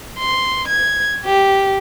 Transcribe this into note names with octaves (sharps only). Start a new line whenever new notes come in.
C6
G#6
G4